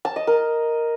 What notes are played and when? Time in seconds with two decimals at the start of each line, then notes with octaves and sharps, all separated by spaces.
0.05 A5
0.16 D#5
0.27 A#4